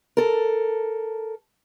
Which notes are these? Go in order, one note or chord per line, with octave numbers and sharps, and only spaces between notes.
A4 A#4